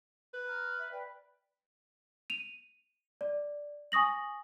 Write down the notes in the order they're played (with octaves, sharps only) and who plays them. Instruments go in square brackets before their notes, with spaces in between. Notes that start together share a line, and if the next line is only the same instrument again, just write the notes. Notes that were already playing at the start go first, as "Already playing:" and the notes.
[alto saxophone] B4
[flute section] A#5 F6
E5
B4 D5 G5
[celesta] D#7 F7
D5
G#5 C#6 D#6 A#6 F#7